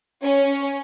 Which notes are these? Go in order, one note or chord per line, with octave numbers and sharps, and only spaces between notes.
C#4